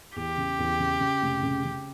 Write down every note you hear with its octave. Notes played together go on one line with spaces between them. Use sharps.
E2 G4
C#3
E2
C#3
C#3
F1
C#3
C#3